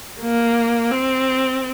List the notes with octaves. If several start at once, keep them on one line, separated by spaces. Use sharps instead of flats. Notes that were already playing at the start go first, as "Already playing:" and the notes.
A#3
C4